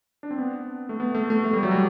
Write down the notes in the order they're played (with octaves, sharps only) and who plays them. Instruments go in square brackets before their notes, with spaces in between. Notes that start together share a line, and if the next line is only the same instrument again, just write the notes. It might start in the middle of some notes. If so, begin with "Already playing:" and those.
[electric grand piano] D4
C4
B3
A3
B3
A3
A3
A3
G3
F#3
G3